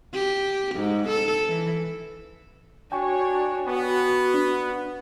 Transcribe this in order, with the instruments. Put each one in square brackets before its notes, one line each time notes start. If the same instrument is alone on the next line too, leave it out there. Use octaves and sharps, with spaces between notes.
[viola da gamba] G4
G#2
A4
E3
[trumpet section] D4 C#5 [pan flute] F#4 [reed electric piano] G5 G#5 C#6
[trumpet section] B3
[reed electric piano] D4